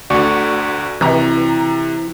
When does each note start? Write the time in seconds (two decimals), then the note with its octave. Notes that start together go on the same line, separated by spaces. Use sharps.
0.10 D2 D3 F#4 D5 C#6
1.01 C3 E3 A#5